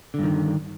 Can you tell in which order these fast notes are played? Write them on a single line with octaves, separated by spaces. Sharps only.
D3 G2 D#3